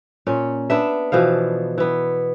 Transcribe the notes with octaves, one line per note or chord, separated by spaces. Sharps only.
A#2 C#4
B3 D4 E5
B2 E3 F3 F5
E3 B3